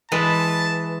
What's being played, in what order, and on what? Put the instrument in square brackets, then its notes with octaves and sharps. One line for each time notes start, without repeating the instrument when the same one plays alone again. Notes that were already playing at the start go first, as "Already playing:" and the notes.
[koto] E3 G#3 B4 [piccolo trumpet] A5